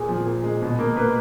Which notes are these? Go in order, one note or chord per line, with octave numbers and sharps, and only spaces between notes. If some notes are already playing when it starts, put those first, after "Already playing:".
Already playing: A#2 G#4
F3
A#2
G#3
B2
A#3
A#3 B4